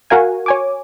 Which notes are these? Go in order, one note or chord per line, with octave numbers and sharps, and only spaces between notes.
F#4 A#4 F5 G#5
C#5 G#5 D6